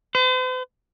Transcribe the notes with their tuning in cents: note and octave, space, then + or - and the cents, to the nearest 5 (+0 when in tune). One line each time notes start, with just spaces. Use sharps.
C5 -45